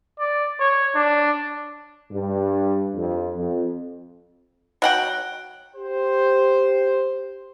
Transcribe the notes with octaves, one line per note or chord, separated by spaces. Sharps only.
D5
C#5
D4
G2
F2
F2
F#3 F#5 G5
G4 C5